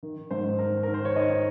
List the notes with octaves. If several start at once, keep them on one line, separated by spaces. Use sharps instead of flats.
D#3
G#2 C5
D#3 A#4
D#3 A#4
C5
C#5
D#3 D#5